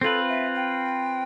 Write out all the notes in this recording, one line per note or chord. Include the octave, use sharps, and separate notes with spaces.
C4 F4 A4 B4
E5
G5